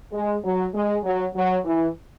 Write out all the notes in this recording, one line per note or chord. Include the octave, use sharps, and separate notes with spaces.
G#3
F#3
G#3
F#3
F#3
E3